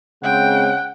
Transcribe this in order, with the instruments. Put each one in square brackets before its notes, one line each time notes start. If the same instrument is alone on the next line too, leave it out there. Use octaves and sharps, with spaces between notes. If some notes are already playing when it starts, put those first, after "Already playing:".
[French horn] C#3 [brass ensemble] G#3 C4 [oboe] F#5 [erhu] G5